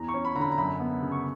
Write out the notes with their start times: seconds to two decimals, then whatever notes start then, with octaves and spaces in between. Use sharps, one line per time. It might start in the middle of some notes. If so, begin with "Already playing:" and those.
Already playing: E2 A#5
0.08 C#6
0.14 C#4
0.25 B5
0.35 D3 A#5
0.41 B5
0.52 A#5
0.58 F#2 B5
0.80 B3
1.02 C#3
1.12 C#6